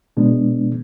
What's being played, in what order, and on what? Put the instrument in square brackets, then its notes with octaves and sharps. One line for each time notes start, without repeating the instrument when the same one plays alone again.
[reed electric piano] B2 G#3 B3 D4